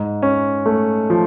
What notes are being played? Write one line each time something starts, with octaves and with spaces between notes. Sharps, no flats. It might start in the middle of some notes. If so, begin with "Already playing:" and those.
Already playing: G#2
C#4
A3
F3